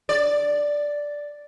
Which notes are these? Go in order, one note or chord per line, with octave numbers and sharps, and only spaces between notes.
D5